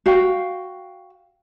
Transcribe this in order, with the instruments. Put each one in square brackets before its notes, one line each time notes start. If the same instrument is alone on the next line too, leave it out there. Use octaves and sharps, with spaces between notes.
[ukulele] F#4 F5 G5